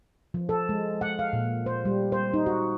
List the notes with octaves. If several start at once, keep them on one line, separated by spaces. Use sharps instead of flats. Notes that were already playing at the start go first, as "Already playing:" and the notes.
F3
A4
G#3
F#5
F5
A#2
C5
G3
C5
D#4
F#4